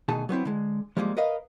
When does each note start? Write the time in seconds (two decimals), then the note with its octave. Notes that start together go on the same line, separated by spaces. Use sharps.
0.08 D2 B2 D#3 G#4 A5
0.29 F#3 B3 C4 E4
0.45 D3 G#3
0.97 F3 G3 G#3 A#3
1.17 A#4 B4 D#5 F5